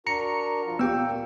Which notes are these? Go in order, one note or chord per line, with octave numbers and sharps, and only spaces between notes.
D4 F#4 A#4 A#5 C#7
F3 F4
A#2 A#3 B3 G4 G5 E6